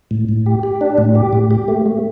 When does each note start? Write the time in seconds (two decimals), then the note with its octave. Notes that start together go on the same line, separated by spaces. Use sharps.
0.11 A2
0.29 A2
0.46 G4
0.63 G4
0.81 D4
0.98 A2
1.15 G4
1.33 A2
1.51 G4
1.68 A3
1.86 A3